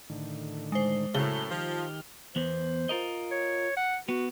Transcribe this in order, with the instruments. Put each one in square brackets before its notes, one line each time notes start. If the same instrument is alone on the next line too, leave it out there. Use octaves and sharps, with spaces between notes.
[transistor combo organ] A2 D3 D#3
[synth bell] G#3 C5
[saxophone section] F#2 A2 [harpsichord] C#3 [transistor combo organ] C#5 A5 [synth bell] G7
[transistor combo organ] D#3 G4 F6 [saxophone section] F3
[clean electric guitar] E2 B3 [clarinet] C5
[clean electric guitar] F4 A#4 D#5
[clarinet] C#5
F#5
[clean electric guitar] B3 [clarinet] F#4